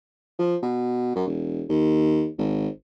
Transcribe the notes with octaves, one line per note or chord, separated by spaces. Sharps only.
F3
B2
F#2
E1
D#2
G#1